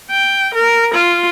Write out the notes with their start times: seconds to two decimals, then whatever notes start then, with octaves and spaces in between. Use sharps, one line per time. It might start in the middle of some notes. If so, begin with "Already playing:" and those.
0.11 G5
0.54 A#4
0.94 F4